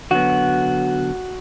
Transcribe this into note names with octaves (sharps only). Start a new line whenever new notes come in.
D3 F#3 B3 F#4